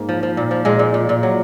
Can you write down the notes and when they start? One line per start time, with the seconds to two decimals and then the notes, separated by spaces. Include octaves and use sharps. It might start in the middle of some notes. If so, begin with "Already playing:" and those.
Already playing: G#2 A#3
0.09 F3
0.23 F3
0.37 A#2
0.51 F3
0.65 A#2 G#3
0.79 A#2
0.94 A#2
1.09 A#2
1.23 F#3